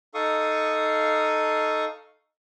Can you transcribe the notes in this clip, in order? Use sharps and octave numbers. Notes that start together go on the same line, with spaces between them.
D#4 A4 F5 C#6 D#6